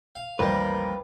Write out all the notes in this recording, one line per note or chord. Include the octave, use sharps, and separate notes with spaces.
F5
A1 D#2 F3 G3 A#3 A#4 B4